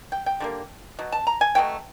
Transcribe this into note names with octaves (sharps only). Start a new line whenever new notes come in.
G5
G5
D3 G3 A#3
B2 F#3
A5
A#5
G#5
B2 F#3 A3 G5